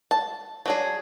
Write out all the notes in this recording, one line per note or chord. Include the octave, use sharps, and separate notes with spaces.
A5
F#3 D4 G#4